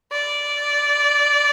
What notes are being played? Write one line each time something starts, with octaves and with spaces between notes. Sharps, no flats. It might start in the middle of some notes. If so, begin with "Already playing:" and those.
D5